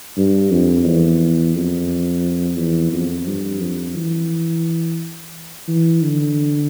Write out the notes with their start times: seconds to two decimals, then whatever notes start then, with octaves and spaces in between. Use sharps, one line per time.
0.17 G2
0.51 F2
0.86 E2
1.55 F2
2.58 E2
2.93 F2
3.27 G2
3.61 F2
3.96 E3
5.68 E3
6.03 D3